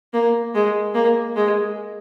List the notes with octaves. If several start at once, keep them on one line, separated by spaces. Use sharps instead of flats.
A#3
G#3
A#3
G#3